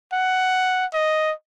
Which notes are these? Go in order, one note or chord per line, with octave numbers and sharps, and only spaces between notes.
F#5
D#5